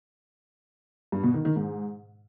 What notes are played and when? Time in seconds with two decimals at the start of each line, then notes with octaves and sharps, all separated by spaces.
1.12 G2
1.23 B2
1.34 D#3
1.45 D#3
1.56 G#2